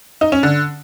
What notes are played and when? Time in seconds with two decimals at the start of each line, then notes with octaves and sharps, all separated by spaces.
0.21 D#4
0.32 C#4
0.43 D3